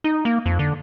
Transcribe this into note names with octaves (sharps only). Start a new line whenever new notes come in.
D#4
A#3
F2
D3